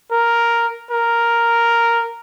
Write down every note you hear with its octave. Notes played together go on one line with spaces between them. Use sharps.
A#4
A#4